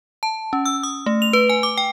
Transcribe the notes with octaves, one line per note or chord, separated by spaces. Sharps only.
A5
C#4
E6
D#6
A3
F7
B4
G#5
D6
G5